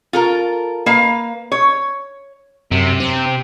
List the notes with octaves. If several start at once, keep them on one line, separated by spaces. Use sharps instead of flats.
F4 A4 A#4
A#3 B4 F5
C#5
F#2 C3
C4